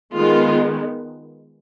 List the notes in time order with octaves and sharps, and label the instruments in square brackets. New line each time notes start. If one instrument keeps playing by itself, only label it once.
[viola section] D#3 G#3 B3 F4